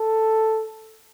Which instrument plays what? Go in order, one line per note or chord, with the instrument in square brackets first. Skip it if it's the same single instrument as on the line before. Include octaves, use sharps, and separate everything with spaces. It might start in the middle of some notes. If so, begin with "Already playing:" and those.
Already playing: [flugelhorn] A4